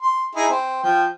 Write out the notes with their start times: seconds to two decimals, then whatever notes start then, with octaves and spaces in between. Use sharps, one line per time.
0.02 C6
0.36 D#4 E4 G#4
0.49 C4
0.83 F3 G5